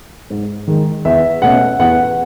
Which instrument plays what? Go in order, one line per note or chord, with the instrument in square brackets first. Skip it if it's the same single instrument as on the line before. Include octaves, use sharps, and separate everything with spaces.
[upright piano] G#2
D#3 G#3
E2 E5
B2 A3 C#4 F#5
E2 F#5